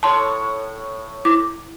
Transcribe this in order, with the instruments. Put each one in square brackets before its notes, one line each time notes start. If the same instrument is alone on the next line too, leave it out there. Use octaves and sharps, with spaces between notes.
[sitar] A2 C#5 [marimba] A5 C6
[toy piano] E4 [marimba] D6